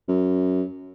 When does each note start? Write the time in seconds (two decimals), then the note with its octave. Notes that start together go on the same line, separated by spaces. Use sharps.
0.09 F#2